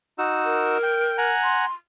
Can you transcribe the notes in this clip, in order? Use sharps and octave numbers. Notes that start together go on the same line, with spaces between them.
D#4 F#4 E6
A#4
G5
F#5 G#5 A#5
C6